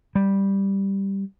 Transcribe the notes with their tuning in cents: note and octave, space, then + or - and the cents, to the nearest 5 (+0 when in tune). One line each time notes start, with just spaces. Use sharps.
G3 +0